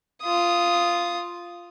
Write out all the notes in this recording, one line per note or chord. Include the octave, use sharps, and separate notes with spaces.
F4 D#6